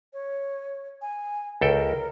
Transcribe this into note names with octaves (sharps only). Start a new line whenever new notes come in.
C#5
G#5
C#2 A4 A#4 G5